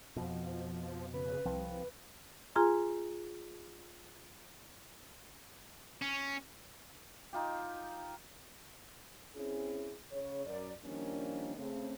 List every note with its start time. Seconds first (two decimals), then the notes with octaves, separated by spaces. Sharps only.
0.16 F2 B2 F3
1.13 C#3 B4
1.45 C2 F3 C4
2.55 F4 G#4 G#5 A#5 C6
6.02 C#4
7.33 D#4 F4 G4
9.36 C4 C#4 E4 G#4
10.11 C#3 C#5
10.46 F#2 A#4 D5
10.85 D#3 F3 G3 A#3 C#4 D4
11.56 C#3 A3 C4